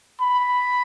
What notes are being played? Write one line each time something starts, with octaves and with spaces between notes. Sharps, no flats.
B5